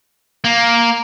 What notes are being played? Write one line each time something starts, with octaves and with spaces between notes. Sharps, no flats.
A#3